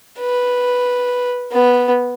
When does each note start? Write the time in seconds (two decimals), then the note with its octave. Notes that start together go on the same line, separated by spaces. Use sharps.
0.20 B4
1.52 B3